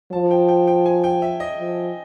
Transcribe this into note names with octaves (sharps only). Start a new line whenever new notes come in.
F3 A5
G5
G5
G5
G#5
G5
E5
D#5
F3